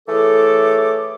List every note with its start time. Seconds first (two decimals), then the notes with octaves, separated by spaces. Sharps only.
0.08 E3 A3 G#4 A4 C#5 D6